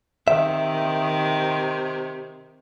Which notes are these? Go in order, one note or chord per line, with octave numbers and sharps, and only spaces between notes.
C3 D#3 E5